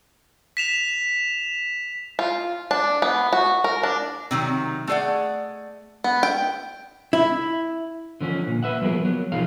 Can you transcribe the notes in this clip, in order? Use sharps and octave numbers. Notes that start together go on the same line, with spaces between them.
B6 E7 F7
F4
D4
B3
F#4
A#4
D4
C3 D#3 F#3
A3 G#4 C5 D5 F#5
B3
G5
E4
D3 F3 C#4
A#2
B4 E5 F#5
F3 F#3 B3 G#4 A#4
F#3 B3
B2 F3 D#4 G#4 F5